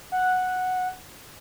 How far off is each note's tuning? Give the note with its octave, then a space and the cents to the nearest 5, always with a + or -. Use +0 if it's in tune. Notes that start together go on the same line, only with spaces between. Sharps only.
F#5 -5